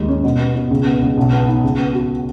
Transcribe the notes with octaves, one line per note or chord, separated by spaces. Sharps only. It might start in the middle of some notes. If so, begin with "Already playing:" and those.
Already playing: D#2 G#3
C#4
B2
B3
B2
C#2
B3
C#2
B1
B3
D#4
C#2
B3
F#4